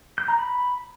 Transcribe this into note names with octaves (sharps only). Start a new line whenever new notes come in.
G6
A#5
B5